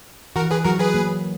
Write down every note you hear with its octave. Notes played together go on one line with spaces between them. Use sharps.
E3 F#4 A#4
G#4 B4
F#3 F#4 A#4
G#4 B4
A#3